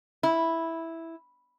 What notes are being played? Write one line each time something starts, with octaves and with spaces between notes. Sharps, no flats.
E4